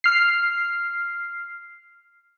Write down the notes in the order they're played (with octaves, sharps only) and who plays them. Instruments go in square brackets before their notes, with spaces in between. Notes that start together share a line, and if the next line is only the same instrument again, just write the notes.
[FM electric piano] F6 C7